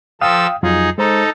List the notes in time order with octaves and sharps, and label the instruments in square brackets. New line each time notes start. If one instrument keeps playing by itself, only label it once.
[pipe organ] F3 A4 E6 [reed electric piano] F5 G5 D#6
[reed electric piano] F2 F#3 F4 [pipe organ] D#4 G#4
[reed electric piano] G#3 C5 A#5 [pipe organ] D#4 A4